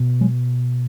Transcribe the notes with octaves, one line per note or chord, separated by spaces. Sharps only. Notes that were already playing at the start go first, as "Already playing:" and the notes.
Already playing: B2
F#3 G#3